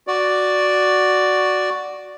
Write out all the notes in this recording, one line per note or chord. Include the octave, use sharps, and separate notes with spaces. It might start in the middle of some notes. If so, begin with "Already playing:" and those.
F#4 D5